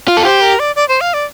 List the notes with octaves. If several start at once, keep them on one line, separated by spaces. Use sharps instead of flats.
F4
A4
G4 C5
A#4
D5
D5
C5
F5
D5